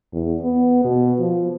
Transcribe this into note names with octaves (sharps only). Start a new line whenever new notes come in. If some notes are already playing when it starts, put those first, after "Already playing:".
E2
B3
B2
F3